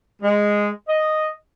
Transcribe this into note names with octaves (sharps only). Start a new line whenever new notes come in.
G#3
D#5